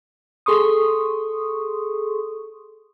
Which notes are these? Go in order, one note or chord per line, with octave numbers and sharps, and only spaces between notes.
G#4 A4 C6 C#6 D#6